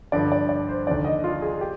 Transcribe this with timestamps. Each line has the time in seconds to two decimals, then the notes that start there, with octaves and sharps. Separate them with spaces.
0.12 G2 D3 F3 D5
0.32 D5
0.49 D5
0.68 C5
0.86 D#2 D3 F3 D5
1.05 D#5
1.24 F4
1.42 G#4
1.61 G4